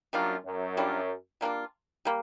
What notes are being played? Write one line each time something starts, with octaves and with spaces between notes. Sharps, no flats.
F#2 G3 A#3 D4 F4
F#2
G3 A#3 D4 F4
G3 A#3 D4 F4
G3 A#3